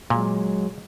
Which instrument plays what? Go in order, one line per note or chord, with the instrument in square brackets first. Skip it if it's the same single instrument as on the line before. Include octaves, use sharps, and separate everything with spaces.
[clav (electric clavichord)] A#2 [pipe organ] F#3 G#3